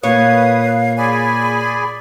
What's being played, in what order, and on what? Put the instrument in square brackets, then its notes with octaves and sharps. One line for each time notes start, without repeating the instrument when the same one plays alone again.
[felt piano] A#2 A#3 [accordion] B4 D#6 [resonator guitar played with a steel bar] C#5 [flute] F5
[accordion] G#4 D5 G#5 [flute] B5